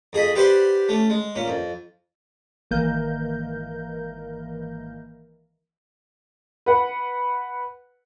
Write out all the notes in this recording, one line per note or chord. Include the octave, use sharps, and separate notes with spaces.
F2 G#4 D#5 B5
G4 B4 C5 D5 F#5 C6
A3 C#4
G#3
A#2 C#4
F2
G#1 D#3 E3 A#3 A#4 G6
B4 F#5